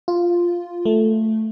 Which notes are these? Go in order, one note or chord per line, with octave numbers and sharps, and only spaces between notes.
F4
A3